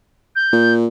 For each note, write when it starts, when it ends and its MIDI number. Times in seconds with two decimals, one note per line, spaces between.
0.35 0.74 91
0.53 0.88 46